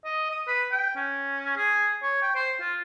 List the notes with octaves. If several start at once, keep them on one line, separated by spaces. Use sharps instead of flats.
D#5
D#6
B4
G5
C#4
G#4
C#5
G5
C5
F4